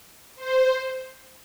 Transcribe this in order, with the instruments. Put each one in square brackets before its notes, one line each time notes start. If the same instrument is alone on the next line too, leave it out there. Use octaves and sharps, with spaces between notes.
[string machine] C5